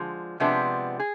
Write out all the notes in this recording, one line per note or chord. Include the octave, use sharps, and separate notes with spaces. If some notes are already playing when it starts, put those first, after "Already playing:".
Already playing: D3 F3 G#3
C3 F3 G#3 B3 D4
G#4